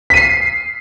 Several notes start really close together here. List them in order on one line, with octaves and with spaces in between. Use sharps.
B6 D#7 C7